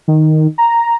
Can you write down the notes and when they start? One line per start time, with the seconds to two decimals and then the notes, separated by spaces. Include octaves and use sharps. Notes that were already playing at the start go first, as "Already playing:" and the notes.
0.08 D#3
0.58 A#5